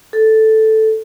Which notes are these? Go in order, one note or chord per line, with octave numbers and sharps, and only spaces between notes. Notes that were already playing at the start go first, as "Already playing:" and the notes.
A4